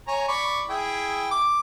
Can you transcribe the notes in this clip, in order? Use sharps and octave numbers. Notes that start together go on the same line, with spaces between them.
C#5 G#5 A#5
D5 B5 C#6
E4 G#4 G5
D6